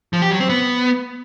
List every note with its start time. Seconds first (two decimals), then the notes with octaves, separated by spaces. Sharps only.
0.13 F3
0.22 G4
0.31 F#3
0.40 C4
0.49 B3